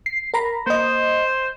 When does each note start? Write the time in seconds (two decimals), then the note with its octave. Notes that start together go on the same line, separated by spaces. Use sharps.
0.06 C7
0.34 A#4 A#5 B5
0.67 A#3 C5 D#5